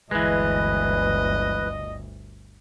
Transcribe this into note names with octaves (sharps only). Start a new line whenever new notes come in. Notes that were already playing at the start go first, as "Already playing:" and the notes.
G1 D2 E3 G#3 B4 D#5